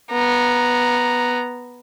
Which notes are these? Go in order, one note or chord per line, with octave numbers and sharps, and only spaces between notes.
B3 A#5